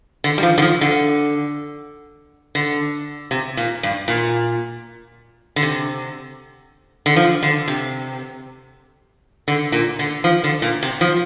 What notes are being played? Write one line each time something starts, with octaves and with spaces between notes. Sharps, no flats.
D3
G3
F3
D3
F3
D3
D3
C3
A#2
G2
A#2
D3
C3
D3
F3
D3
C3
D3
A#2
D3
F3
D3
A#2
C3
F3